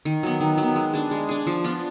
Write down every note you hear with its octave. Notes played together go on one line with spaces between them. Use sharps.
D#3
F#3 B3
D#3
F#3 B3
G#3
D4 G#4
G#3
D4 G#4
F3
B3 D4 F4